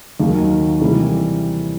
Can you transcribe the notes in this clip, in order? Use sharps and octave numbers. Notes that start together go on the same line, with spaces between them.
D#2 D#3 F#3 A#3
C3 E3 G3